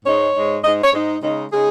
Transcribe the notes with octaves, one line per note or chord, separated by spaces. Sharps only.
G#2 G#3 D#4 C#5
G#2 G#3 D#4
G#2 G#3 D#4 D#5
C#5
G#2 G#3 D#4
C#3 G#3 D#4
C#3 G#3 D#4 G#4